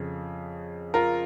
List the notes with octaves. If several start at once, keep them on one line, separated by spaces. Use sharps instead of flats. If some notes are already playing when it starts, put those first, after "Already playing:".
Already playing: F2 C#3
F4 A#4